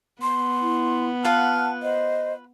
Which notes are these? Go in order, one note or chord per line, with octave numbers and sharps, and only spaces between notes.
B3 C6
E4
F4 B4 F#5 A5 F6
C5 D#5